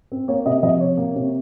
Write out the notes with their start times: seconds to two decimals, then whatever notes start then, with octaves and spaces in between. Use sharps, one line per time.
0.12 C4
0.28 A#3 C#5
0.46 C3 D#5
0.63 F3 D#5
0.80 C3 C#5
0.97 A#3
1.15 C3